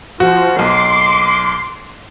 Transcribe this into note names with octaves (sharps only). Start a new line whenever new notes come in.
F3 F#4
B1 C6 D6 C7